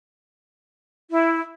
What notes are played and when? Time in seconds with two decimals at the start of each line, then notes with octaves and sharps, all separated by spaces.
1.11 E4